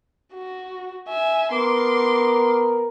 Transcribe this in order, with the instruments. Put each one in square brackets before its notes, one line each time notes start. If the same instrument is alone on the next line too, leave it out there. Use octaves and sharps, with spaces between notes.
[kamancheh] F#4
E5 G#5
[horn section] B3 A#4 [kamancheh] C6 D6